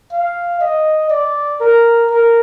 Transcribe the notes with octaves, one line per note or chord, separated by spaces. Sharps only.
F5
D#5
D5
A#4
A#4